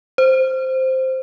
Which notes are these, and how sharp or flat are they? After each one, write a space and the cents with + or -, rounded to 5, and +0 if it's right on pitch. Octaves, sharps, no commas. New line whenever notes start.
C5 +0